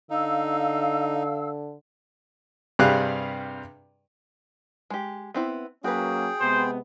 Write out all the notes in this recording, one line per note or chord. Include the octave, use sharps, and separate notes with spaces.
D3 D#4 F5 E6
G2 C3 G3 G#4 F5 F#6
G#3 G4
B3 C4 E4
F#3 A#3 C#4 F#4 G#4 B4 G5
C3 G#3 B3 C5